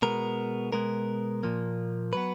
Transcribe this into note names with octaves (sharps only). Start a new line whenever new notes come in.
B2 G#3 B3 A#4
B2 G#3 B3 A#4
A#2 F3 A#3
F#3 B3 B4